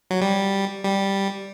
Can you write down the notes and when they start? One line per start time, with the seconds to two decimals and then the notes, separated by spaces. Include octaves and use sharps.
0.11 F#3
0.21 G3
0.84 G3